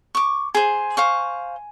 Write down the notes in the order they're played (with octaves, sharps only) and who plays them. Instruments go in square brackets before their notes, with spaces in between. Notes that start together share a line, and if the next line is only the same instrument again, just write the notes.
[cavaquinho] C#6 D6
[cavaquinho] G#4 C5 [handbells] G#5
[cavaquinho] C5 F5 C#6